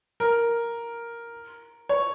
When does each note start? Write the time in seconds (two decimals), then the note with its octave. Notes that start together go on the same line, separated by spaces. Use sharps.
0.20 A#4
1.89 C#5